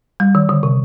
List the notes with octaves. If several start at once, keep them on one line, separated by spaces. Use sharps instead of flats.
G3
D#3
D3
C3